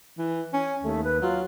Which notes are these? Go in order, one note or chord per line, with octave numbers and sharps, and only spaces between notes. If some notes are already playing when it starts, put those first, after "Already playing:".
E3
C#4 G#5
D#2 A3
B4
F#3 F4